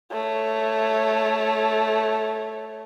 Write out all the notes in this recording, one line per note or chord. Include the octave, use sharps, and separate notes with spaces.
A3 C#5